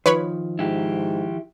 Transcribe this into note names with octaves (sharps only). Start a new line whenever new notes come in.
D#3 F3 B4 C#5 B5
G#2 E4 G4